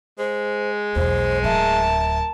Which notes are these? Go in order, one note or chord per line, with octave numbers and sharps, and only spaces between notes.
G#3 C5
B1 E2 C5
D1 A#4 E5 A5